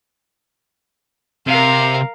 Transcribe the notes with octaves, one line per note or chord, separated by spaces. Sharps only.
C3 A#4 F5